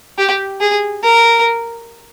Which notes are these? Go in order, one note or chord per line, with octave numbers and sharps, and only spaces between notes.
G4
G#4
A#4